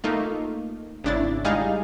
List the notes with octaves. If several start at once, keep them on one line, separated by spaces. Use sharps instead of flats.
A3 A#3 D#4 F4
G#1 C#3 D4 E4 A6
G3 G#3 D#4 G#4 F5